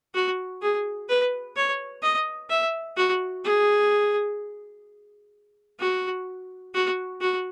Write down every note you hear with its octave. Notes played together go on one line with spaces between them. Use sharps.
F#4
G#4
B4
C#5
D#5
E5
F#4
G#4
F#4
F#4
F#4